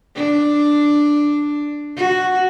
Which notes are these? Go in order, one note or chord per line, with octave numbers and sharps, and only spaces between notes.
D4
F#4